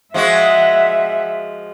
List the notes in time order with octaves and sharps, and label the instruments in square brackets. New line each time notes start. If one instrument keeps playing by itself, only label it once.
[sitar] F3 G#3 F#4 [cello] E5 F#5